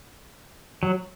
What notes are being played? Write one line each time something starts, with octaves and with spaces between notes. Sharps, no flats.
F#3